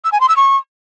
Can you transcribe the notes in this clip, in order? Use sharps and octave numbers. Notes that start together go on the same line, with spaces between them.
E6
G#5
C6
E6
C#6